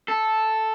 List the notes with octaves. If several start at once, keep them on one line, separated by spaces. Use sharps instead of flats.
A4